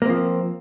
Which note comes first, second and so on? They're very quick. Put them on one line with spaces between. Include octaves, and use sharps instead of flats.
A#3 C4 F3